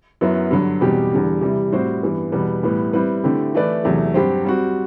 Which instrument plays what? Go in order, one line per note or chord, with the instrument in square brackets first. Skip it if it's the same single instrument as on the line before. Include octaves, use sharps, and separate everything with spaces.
[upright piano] F#2 F#3 B3 E4
G2 D3 F#3
E2 B2 G3 C4 G4
E2 D3 G3
C3 E3 G3
A2 G3 C4 F#4 C5
G2 E3 B3
E2 B2 G3 B3
A2 E3 G3 B3
G3 C4 E4 B4
D3 A3 C4 E4 G4
E3 A3 E4 B4 D5
E2 C3 F#3 A3
G2 F#3 C4 G4 C5
G3 C4 F#4